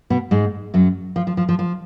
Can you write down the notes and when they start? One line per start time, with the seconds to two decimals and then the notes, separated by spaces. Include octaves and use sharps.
0.10 B2 B3
0.31 G#2 G#3
0.74 F#2 F#3
1.16 F3
1.27 F3
1.37 F3
1.49 F3
1.59 F3